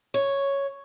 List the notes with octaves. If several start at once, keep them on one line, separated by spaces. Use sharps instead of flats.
C#5